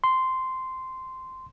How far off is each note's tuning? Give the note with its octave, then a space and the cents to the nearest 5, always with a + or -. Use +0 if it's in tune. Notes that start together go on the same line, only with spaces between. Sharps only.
C6 -10